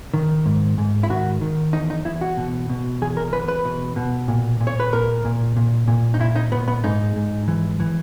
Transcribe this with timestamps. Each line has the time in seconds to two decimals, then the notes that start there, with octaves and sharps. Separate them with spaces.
0.14 D#3
0.46 G#2
0.78 G#2
1.03 E4
1.09 D#3 F#4
1.41 D#3
1.73 E2 D#4
1.90 D#4
2.05 E2 E4
2.21 F#4
2.37 B2
2.70 B2
3.02 E2 G#4
3.17 A#4
3.33 E2 B4
3.48 B4
3.65 B2
3.96 B2
4.28 A#2
4.60 A#2
4.67 C#5
4.80 B4
4.93 A#2 A#4
5.25 A#2
5.56 A#2
5.88 A#2
6.14 D#4
6.19 A#2 E4
6.36 D#4
6.52 A#2 B3
6.68 B3
6.84 G#2 D#4
7.16 G#2
7.48 E3
7.80 E3